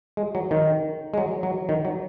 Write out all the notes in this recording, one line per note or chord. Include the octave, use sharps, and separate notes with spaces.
G#3
F#3
D#3
G#3
F#3
F#3
D#3
F#3